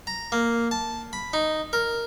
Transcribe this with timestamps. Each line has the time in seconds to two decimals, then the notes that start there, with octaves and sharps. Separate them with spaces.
0.07 A#5
0.32 A#3
0.71 A5
1.13 B5
1.33 D#4
1.73 A#4